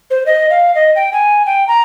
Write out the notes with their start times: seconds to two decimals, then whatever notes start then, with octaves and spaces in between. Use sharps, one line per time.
0.11 C5
0.26 D#5
0.50 F5
0.75 D#5
0.96 G5
1.13 G#5
1.46 G5
1.68 A#5